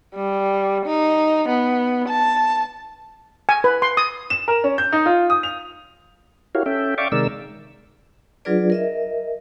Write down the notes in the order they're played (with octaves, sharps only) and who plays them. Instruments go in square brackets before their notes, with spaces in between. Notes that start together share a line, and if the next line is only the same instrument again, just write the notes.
[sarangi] G3
D#4
B3
A5
[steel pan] G#5
B4
C6
D#6
[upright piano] E7
A#4
C#4
G6
D#4
F4
D#6
F7
[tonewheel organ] E4 F#4 G4 A#4 C#5 F5
C#4 A4 E5 G5
D5 E5 F5 G5 C#6 D6
C3 D#3 G#3 A#4 D5 E6
[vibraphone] F#3 D4 F4 G#4 B4 D5
A#4 D#5 E5